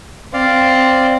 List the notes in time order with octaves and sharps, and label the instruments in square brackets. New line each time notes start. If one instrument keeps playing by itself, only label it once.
[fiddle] C4 [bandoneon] D5 F5